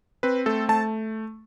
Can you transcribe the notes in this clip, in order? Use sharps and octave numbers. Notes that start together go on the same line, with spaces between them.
C4 B4
A3 A4
A3 A5